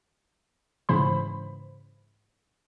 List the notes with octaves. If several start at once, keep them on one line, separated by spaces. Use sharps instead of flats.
G#2 C#3 E3 C5 B5